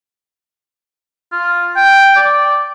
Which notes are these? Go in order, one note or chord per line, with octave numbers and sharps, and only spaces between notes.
F4
G5
D5